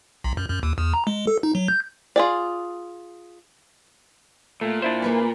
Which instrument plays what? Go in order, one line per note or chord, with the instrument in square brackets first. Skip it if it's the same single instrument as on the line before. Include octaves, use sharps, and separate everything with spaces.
[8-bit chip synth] B1
F#2
F#2
D#2
E2
A#5
G#3
A4
D#4
F#3
G6
[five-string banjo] F4 G#4 D5
[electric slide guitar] A#2 [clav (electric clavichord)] A3
[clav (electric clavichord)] D4 E4 C5
[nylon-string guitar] A#3 G#4 B4